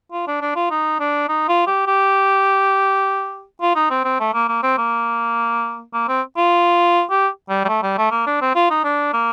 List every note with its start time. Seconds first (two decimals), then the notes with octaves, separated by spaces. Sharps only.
0.12 F4
0.27 D4
0.42 D4
0.56 F4
0.71 D#4
1.00 D4
1.29 D#4
1.49 F4
1.67 G4
1.87 G4
3.61 F4
3.76 D#4
3.91 C4
4.04 C4
4.20 A3
4.34 A#3
4.49 A#3
4.63 C4
4.78 A#3
5.94 A#3
6.08 C4
6.37 F4
7.10 G4
7.49 G3
7.65 G3
7.68 A3
7.83 G3
7.98 A3
8.11 A#3
8.26 D4
8.41 C4
8.55 F4
8.71 D#4
8.84 D4
9.13 A#3